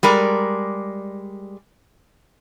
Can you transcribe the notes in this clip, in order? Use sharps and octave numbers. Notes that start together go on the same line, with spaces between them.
G3 G#3 A#4 D5